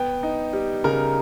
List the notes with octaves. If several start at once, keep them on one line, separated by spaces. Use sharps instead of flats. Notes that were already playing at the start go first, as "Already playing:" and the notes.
Already playing: B3 G5
D#4
G3
C#3 A#4 A#5